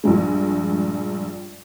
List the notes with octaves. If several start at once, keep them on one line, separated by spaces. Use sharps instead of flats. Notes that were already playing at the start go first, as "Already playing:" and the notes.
A#1 G2 G#3